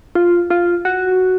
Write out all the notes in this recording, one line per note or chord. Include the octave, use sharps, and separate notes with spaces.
F4
F4
F#4